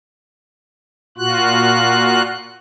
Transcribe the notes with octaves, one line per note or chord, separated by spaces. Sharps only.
A#2 F4 F#4 F#6